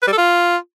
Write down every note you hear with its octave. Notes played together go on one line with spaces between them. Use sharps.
B4
G3
A4
F4